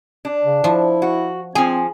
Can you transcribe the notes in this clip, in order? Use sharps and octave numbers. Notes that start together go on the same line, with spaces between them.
D4
C#3
F3 E4
F#4
F3 C4 G#4 G#5